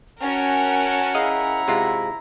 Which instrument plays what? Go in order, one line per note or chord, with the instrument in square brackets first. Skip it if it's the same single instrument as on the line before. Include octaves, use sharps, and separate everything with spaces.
[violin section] C#4 A#4 [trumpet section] F#4 G#5 A5 [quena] F#5
[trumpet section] E4 A#5 [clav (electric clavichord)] G#4 D#5 F5
[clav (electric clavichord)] C3 G#3 F4